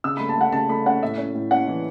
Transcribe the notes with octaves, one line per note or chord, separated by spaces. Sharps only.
C#3 E6
A3 B5
A5
A3 F#5
C#3 A5
A3 B5
C#4 F#5
A2 E5
C#4
A2
C#4 F#5
E3